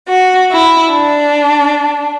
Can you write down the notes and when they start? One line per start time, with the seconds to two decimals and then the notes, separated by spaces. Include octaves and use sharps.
0.09 F#4
0.51 E4
0.93 D4